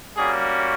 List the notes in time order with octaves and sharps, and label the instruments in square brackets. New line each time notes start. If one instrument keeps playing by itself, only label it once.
[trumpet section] G3 A#3 C#4 F#4 G#4